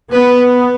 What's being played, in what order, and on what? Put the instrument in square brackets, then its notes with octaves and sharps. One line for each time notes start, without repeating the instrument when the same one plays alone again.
[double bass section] B3 [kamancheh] B4